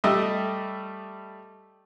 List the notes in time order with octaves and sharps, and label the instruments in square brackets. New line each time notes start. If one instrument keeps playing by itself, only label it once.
[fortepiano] G3 A3 D#5 E5